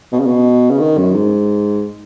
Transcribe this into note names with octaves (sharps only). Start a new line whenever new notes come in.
B2
C#3
B2
C#3
D#3
F#2
G#2